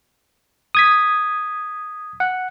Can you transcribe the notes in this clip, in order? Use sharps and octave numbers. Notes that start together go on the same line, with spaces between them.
D#6 G#6 B6
F#5